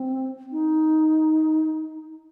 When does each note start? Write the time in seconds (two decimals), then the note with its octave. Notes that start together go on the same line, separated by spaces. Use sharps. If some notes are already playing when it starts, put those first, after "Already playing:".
Already playing: C4
0.52 D#4